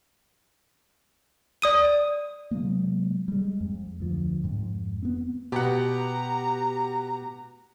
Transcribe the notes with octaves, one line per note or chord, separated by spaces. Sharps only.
D5 D#6 D#7
C3 F#3 G#3 A#3
G3 G#3
F2
D2 F3
F2 G#2
B3 C4
B2 G4 F#5 A#5